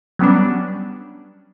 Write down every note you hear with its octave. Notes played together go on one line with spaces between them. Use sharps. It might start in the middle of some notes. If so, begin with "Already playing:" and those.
F#3 G3 B3 C#4 D4